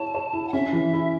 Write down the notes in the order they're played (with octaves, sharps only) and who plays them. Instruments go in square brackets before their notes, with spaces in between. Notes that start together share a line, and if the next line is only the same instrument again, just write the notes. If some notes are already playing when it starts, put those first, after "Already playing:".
Already playing: [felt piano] E4 C#5 [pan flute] A5
[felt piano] C#5
E4
[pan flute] F#5
[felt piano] C#4 [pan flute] E5
[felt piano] E3
E4